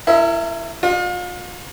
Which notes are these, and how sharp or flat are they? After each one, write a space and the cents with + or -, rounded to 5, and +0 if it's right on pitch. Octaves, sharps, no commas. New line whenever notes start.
E4 +25 A#4 -30 E5 -35
F4 +35 D#5 -40